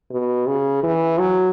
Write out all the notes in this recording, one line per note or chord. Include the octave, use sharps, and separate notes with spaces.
B2
C#3
E3
F#3